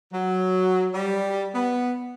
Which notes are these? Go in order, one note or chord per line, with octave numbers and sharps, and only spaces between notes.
F#3
G3
B3